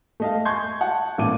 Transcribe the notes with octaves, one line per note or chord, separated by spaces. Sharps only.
A3 D#5 F5
G#5 C6 C#6 G6 G#6
F#5 A5
A1 A#2 D6 D#7